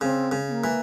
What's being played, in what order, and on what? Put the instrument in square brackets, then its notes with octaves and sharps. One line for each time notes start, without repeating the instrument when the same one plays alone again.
[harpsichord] C#3 [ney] C4
[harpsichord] C#3
[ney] C4
A#3
[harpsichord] E3